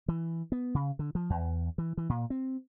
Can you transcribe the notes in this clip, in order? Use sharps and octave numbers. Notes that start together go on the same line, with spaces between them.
E3
B3
C#3
D3
F3
E2
E3
E3
A#2
C4